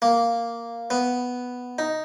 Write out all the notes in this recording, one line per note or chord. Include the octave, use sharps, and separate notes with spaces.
A#3
B3
D#4